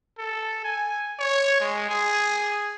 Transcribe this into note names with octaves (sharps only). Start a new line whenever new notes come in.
A4
G#5
C#5
G#3
G#4